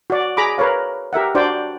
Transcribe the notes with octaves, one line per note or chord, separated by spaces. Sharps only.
F#4 D5
G#4 A#5 B5 D6
A#4 B4 C#5 F5
G4 A#4 E5 F#5
D4 F#4 C5 D5 G5